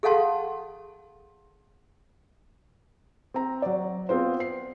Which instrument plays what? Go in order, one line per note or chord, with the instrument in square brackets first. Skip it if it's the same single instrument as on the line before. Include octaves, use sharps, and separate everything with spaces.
[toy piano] G#4 A4 F5 F#5 A5 C6
[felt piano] C4 A#5
F#3 D5
B3 C4 F4 C5
C7